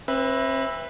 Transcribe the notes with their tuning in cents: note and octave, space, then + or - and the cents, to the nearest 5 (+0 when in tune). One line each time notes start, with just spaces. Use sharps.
C4 +40 B4 +0 E5 +0